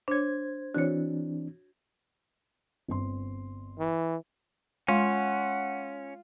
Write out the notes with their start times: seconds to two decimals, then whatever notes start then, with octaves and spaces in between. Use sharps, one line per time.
0.08 D4 C5 C#5 G#6
0.75 E3 C4 D4 F#4 C#5
2.88 G1 C4 C6
3.79 E3
4.88 G#3 C#4 F4 F#5